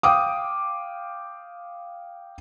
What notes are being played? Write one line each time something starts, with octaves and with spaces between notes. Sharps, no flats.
F5 G5 D6 D#6